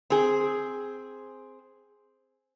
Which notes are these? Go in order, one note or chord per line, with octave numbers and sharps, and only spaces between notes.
C4 G#4